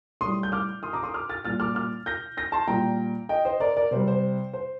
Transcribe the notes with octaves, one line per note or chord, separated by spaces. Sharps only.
A2 G3 C6 D#6
G6
D6 F6
C6 D#6
A#5 D6
C6 D#6
D6 F6
F6 A6
A#2 G3 F6 A6
D6 F6
D6 F6
G6 A#6
G6 A#6
A5 C6
A#2 G3 G5 A#5
D#5 G5
C5 D#5
A#4 D5
A#4 D5
C3 G3 C5
C5
C5